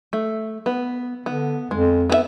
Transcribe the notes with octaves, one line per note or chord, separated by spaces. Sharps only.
A3
B3
D3 B3
F2 G#3
B3 G#4 E5